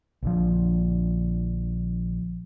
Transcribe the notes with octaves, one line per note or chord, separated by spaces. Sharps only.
A#1 D3 F3